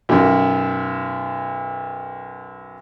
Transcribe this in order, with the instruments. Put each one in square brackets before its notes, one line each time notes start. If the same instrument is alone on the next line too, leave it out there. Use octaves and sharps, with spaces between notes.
[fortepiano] B1 F#2